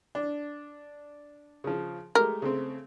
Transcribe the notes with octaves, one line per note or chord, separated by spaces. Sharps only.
D4
C#3 F3
G#3 A3 G4 A#4
C#3 A3 C4